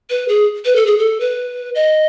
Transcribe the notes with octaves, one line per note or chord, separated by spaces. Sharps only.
B4
G#4
B4
A4
G#4
A4
B4
D#5